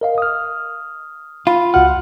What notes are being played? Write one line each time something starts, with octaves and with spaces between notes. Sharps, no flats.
A#4 D#5 F5
D#6 F6
F4 B5
C#2 F#4 F#5 F6